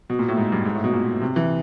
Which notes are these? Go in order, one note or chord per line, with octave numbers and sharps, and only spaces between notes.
B2
A#2
A2
G#2
G2
G#2
A2
B2
A#2
C3
E3